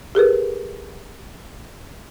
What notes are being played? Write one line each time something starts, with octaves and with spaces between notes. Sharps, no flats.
G4 G#4 A#4 B4